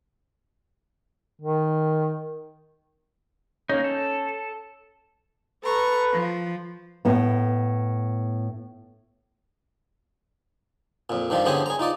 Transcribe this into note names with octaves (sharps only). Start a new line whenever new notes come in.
D#3
A#3 C#4 D#4
A4
A4 B4 A#5 C#6
F3
A2 B3
F2 A#2
G2 D#3 F3 G3 F4
D3 G3 B3 C#4 G#4 C5
G#4 A#5
D#4 F4 D5 D#5